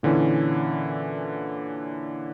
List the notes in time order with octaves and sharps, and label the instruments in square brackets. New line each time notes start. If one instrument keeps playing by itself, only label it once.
[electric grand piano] A#2 D3 E3 C#4 E4